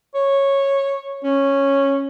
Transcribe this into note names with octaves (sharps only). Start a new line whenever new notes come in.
C#5
C#4